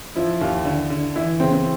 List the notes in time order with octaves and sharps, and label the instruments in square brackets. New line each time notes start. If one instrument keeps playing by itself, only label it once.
[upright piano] F3 [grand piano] E4
[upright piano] D#2
D3
D3
[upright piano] E3 [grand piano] E4
[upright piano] C#3 [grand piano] C4
[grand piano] C4